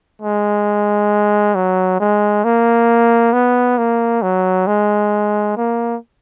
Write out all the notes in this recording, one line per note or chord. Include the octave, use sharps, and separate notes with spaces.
G#3
F#3
G#3
A#3
B3
A#3
F#3
G#3
A#3